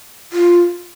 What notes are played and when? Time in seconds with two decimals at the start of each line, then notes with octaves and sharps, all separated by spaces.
0.33 F4